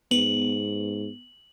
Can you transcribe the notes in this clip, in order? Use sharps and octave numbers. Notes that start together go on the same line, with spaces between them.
G#2 B3 F#7